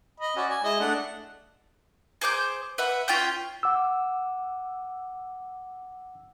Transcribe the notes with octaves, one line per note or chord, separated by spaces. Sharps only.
D#5 B5
C#4 F#4 D5
G#5
G#3 E4 D#5
A3 D4 F#5
G#4 C5 D6 G6
B4 E5 F#5
C#4 F4 G5 G6
F#5 D6 E6